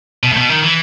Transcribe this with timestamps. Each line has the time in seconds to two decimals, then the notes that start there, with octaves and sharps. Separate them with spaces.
0.23 B2
0.32 A2
0.37 B2
0.49 D#3
0.62 E3